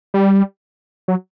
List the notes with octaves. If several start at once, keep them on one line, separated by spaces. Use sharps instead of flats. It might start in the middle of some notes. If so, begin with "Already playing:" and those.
G3
F#3